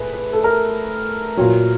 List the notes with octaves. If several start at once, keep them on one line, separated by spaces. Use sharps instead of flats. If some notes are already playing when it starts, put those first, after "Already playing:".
Already playing: A2 G#4 B4
B4
A4
A#4
A#2 F#3